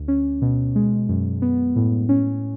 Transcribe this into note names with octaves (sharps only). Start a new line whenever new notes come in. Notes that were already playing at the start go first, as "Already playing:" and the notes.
Already playing: D2
C#4
B2
G#3
F#2
B3
A2
C#4